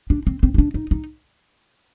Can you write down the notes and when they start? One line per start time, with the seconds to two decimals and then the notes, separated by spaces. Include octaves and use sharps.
0.10 D4
0.27 C4
0.43 C4
0.54 D#4
0.58 D4
0.74 D#4
0.91 D#4